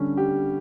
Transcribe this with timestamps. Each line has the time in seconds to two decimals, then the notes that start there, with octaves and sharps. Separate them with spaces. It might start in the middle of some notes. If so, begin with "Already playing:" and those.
Already playing: D3 G3 C#4
0.17 G4